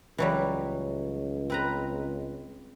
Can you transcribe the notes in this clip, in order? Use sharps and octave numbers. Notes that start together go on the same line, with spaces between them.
C#2 E3 F#3 G3
C4 B4 A#5